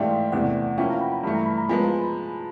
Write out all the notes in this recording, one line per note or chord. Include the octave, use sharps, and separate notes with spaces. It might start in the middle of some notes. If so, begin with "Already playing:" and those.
Already playing: G#2 E3 A3 D4 G4 E5 F5
E2 C3 E3 A3 D4 F#5
F3 A#3 C#4 E4 G5
A#5
B5
B5
G2 E3 A3
A#5
B5
A#5
F3 G#3 B3 G#5